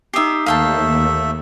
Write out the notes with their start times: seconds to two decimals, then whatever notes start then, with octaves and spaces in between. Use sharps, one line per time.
0.14 D#4 G4 E5 D#6 C7
0.46 D#2 A3 E5 F5 G5 A5